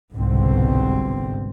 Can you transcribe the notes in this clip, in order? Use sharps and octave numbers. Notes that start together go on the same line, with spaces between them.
G1 C2 G#2 B2 D3 C4